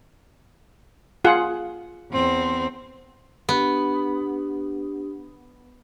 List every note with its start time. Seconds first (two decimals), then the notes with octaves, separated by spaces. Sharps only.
1.25 F4 G#4 F#5
2.11 E2 C4
3.49 B3 D4 G4